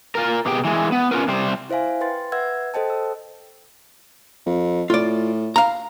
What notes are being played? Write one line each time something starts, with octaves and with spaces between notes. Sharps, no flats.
F4 A#4
B2 G4 G#4 G5
E3 G#3
B3
C#4 F4 A#4 B4
C3 G3 G4 C5
E4 C5 E5 F5 G#5
B4 G5 C6 A6
B4 E5 F#5 E6 G#6
A4 C5 D#5 G5 A5
E6
F2
A2 F4 D5
F5 A#5